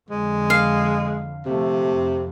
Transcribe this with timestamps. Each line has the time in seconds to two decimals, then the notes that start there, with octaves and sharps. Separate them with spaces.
0.10 F2 D3 G#3
0.50 F5
1.45 C3 F3 A3
1.92 F2